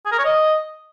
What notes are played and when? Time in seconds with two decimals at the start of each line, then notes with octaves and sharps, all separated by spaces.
0.05 G#4
0.12 A#4
0.18 C#5
0.25 D#5